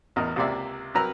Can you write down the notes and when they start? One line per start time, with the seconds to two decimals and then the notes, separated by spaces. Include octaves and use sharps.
0.16 A1 E2 A#4 D#5
0.36 C#2 C3 A#3 C5 D5 E5
0.94 C2 F#3 A#4 B4 A#5 E6